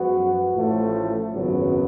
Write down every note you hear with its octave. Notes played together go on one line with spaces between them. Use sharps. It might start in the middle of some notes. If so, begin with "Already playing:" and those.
Already playing: F#2 F3 G#3 B3 F#4
A1 A2 F3 A3
G#1 F#2 C#3 F#3 B3